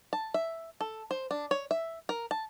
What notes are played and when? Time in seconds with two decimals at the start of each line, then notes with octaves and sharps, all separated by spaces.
0.13 A5
0.34 E5
0.81 A4
1.11 C5
1.31 D4
1.51 C#5
1.71 E5
2.09 A#4
2.31 A5